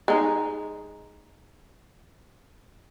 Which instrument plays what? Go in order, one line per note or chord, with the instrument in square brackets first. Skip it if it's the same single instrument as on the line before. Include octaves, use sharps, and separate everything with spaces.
[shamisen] G#3 D#4